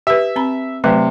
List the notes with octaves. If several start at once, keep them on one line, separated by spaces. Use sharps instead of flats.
G4 B4 E5
C4 A#5 B5
C3 F#3 A3 B4